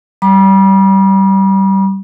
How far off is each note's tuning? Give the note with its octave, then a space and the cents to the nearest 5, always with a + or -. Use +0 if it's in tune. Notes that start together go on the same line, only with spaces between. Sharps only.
G3 -20 B5 -40 D6 +30